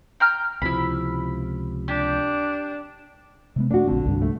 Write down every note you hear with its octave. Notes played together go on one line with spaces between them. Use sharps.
G5 A#5 F6
C#2 C3 F3 E4 B5
D4 G4
C3 G#3 B3
A3 D4 F#4
A#1 D3 C4
C2 G2 D4
A3